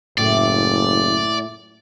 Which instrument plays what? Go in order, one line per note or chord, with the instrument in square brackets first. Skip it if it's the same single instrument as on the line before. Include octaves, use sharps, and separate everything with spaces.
[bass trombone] F#1 [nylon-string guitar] A2 A3 [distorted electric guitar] D5